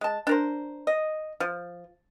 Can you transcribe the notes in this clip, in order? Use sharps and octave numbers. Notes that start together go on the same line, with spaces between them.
G#3 A5
D4 A#4 C5
D#5
F3